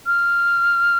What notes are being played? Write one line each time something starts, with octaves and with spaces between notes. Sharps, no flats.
F6